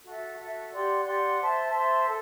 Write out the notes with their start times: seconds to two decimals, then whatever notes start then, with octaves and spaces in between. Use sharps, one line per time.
0.03 F#4 A4 E5
0.37 F#4 A4 E5
0.71 G4 D5 F#5 C6
1.04 G4 D5 F#5 C6
1.39 C5 E5 A5 C6
1.72 C5 E5 A5 C6
2.05 A4